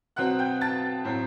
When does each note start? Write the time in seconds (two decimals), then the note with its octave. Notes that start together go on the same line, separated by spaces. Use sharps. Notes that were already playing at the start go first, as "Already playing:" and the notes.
0.16 B2 F#3 C4 F#5 F#6
0.39 G5 G6
0.61 A5 A6
1.05 A2 F#3 C4